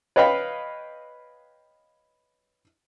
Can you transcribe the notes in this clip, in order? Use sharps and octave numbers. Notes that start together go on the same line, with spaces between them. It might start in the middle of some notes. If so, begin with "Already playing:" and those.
B4 C#5 D#5 F5 G5 B5